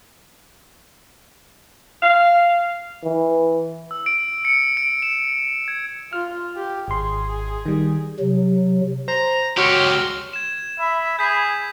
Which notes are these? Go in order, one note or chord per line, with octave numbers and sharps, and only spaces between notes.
F5
E3
E6
D7
C#7
D7
E7
G#6
F4 F6
G4
G#1 G#4 C6
D#3 G3
C3 F#3
C5 A#5
C#2 F#4 G4 C#5 C6 E6 F6
G#6 E7
E5 B5
G#4 G6 B6